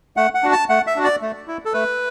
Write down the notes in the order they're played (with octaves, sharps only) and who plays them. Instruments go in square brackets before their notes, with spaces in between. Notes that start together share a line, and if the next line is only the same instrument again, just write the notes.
[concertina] A3 F#5
F#5
D4 F#4
A5
A3 F#5
E5
D4 F#4
D5
A3
E4
A4
A3 B4